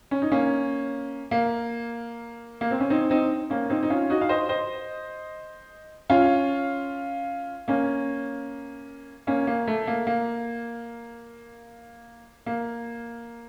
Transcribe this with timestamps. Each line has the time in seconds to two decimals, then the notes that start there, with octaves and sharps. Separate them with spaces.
0.11 C#4
0.22 D#4
0.32 A#3 C#4
1.31 A#3
2.61 A#3
2.71 C4
2.80 C#4
2.90 C4 D#4
3.10 C4 D#4
3.50 A#3 C#4
3.70 C4 D#4
3.83 D#4
3.90 C#4 F4
4.10 D#4 F#4
4.21 F5
4.29 C5 D#5
4.49 C5 D#5
6.10 C#4 F4
7.68 A#3 C#4
9.27 A#3 C#4
9.47 A#3
9.67 A3
9.87 A#3
10.07 A#3
12.46 A#3